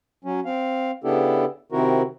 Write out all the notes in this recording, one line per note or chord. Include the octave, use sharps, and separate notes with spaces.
F#3 C#4
C4 F5
C#3 B3 D4 E4 G4 A4
C3 D#3 C4 E4 F#4 A#4